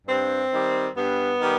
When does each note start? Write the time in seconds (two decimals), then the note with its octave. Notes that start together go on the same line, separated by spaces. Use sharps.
0.07 G2 C4
0.51 D#3 G3
0.96 G2 B3
1.40 D#3 G3